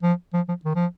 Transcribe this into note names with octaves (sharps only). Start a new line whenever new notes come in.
F3
F3
F3
D#3
F3